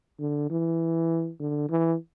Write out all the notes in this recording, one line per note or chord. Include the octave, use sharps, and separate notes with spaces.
D3
E3
D3
E3